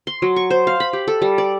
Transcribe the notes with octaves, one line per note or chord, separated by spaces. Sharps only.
C6
F#3
C#6
C5
F5
B5
G4
A4
G3
D5